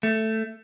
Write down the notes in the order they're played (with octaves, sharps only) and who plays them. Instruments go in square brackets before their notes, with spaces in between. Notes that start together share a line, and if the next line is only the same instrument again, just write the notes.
[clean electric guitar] A3